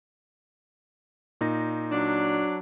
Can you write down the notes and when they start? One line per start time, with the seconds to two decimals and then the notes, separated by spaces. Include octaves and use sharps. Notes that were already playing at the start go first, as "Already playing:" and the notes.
1.41 A#2 D#4 A#6
1.91 F#3 D4